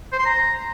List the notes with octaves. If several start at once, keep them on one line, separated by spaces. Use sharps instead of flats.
C5
C6
A#5